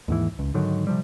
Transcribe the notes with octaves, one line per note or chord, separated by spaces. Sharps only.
D#2 G#2 E3
C#2
G#2 D3 D#3 F#3
C3 F3 G3